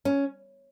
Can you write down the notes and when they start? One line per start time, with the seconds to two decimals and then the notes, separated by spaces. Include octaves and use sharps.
0.05 C#4